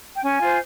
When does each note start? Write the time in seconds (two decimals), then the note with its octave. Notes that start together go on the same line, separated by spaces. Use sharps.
0.14 G5
0.23 C#4 G#5
0.40 F4 C5